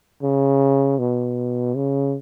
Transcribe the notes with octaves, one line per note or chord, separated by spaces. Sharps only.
C#3
B2
C#3